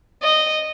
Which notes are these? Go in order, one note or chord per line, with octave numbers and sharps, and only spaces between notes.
D#5